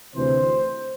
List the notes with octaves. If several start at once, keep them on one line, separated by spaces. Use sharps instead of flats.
D2 C3 E3 C5